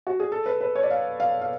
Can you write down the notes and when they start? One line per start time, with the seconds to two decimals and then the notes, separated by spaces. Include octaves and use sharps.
0.07 F#4
0.20 G#4
0.32 A4
0.46 B4
0.61 B4
0.75 C#5
0.83 D5
0.90 F5
1.20 F5
1.42 F5